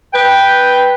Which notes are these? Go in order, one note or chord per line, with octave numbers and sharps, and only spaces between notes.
B4 G5